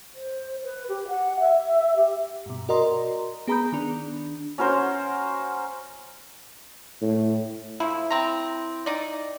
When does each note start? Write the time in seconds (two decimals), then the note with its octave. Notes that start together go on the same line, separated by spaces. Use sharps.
0.14 C5
0.63 B4
0.89 G4
1.08 F#5
1.40 E5
1.96 G4
2.46 G2 B2
2.69 F#4 A#4 D5 D#5 A#5 C6
3.48 B3 G#4 A#5 B5 D#6 G6
3.72 D#3 D4
4.58 C#4 F#4 A#4 C5
7.02 A2
7.80 F3 E4
8.10 C4 A#5
8.86 D#4 D5